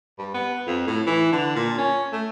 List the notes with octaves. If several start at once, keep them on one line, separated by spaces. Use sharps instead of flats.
G2
B3
F2
A2
E3
D3
A#2
C#4
A3